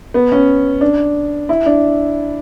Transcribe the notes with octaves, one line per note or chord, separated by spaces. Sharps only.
B3
C#4
D4
E4
D4